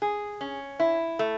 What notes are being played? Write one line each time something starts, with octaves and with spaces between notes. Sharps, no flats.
G#4
C#4
E4
A3